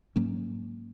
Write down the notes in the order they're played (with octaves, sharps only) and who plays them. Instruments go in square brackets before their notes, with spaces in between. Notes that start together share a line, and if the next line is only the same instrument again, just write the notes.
[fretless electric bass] G#2 F#3 A#3 C#4